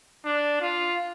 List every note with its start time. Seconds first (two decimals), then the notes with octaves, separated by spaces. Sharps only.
0.25 D4
0.62 F4